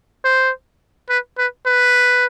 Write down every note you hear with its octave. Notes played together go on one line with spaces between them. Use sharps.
C5
B4
B4
B4